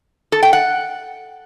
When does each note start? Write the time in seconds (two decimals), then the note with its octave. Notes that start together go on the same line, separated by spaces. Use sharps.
0.32 A4
0.43 G5
0.53 F#5